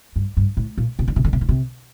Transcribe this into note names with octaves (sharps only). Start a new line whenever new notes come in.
G2
G2
A2
A#2
C3
D3
C3
D3
C3
D3
C3